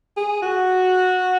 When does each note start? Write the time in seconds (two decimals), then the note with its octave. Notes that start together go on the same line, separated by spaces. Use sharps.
0.17 G#4
0.42 F#4